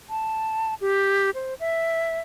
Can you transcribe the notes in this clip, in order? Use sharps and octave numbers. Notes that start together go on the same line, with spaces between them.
A5
G4
C5
E5